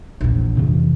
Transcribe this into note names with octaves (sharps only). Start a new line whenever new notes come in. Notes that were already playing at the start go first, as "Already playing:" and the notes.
A#1 E2
F2 C3 E3